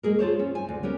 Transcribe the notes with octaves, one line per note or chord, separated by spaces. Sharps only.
G#3 A#3 G#4 A#4
F4 A4 C5 C#5
C#4
G#5
D2
B3 C#4 G4 A#4